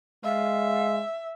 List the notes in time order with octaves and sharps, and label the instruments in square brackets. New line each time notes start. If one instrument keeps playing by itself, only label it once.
[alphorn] G#3 [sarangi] E5 [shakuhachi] F5